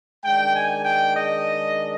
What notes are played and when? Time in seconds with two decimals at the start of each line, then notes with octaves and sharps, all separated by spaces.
0.24 D#3 G#3 D4 G5
0.55 G#5
0.84 G5
1.15 D#5